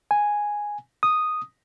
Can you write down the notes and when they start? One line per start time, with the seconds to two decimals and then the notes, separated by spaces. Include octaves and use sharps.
0.11 G#5
1.03 D#6